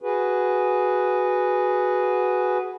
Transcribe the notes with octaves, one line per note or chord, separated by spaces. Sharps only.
F#4 G#4 B4